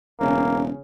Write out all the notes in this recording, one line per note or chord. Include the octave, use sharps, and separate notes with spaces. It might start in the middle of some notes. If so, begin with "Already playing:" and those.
E1 C#3 A#3 C#4